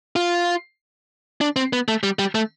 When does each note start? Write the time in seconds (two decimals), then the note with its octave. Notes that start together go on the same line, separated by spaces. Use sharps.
0.16 F4
1.41 D4
1.56 C4
1.73 B3
1.88 A3
2.03 G3
2.19 G3
2.35 A3